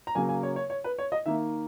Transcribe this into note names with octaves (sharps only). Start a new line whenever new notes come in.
A#5
C#3 F#3 A#3 G#5
G#5
C#5
C#5
C#5
B4
C#5
D#5
D#3 A#3 E5